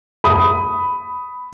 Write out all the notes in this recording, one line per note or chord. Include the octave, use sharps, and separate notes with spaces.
B5 D#6